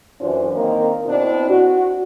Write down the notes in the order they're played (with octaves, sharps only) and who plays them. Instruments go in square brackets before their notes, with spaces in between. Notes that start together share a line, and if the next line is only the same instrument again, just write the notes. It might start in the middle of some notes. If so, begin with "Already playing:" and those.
[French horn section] F#2 E3 D4 F4 C5
D#3 A#3 C4 A#4
B2 C4 D4 E4
F#4